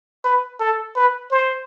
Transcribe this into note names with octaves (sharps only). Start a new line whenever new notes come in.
B4
A4
B4
C5